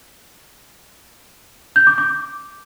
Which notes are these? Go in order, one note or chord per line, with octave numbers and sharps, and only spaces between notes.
G6
D6
D6